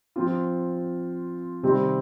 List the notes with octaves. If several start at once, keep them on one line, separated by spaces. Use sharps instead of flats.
F3 C4 F4
C3 D#3 G3 C4